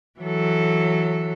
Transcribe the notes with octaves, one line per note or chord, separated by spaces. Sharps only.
E3 F#3 A4